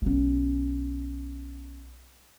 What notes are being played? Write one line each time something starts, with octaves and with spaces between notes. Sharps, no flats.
B1 C#4